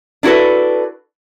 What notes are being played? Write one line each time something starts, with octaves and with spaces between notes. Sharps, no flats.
D4 E4 F#4 A4 B4